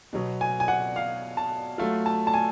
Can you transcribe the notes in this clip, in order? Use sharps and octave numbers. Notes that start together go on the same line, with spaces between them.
B2 F#3 B3
G#5
G#5
F#5
F5
A5
F#3 A3 F4
A5
A5
G#5